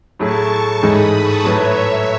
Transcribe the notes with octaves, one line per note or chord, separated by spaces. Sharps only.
A2 F#3 A3 E4 G#4 A5 C#6
G#2 E3 G#3 D#4 A4 B5 D#6
A5 C#6
A2 F#3 A3 E4 B4 C#5 E5